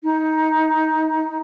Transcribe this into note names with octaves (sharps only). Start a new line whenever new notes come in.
D#4